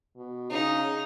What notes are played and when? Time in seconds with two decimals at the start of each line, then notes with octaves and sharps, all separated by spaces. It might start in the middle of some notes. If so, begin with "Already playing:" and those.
0.17 B2
0.51 C#3 D#4